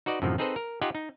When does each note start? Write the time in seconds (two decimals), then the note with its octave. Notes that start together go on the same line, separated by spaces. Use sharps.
0.06 D#4 F#4 B4 D5 D#5
0.22 F#2 A2 C3 D#3 F3
0.38 C4 D#4 G#4 A4 B4 C5
0.56 A#4
0.82 D#4 F4 G4 D#5 F#5 G#5
0.95 D#4